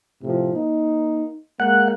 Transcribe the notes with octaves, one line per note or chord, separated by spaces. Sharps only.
A2 C3 F3
A#3 D#4
G#3 A#3 F#5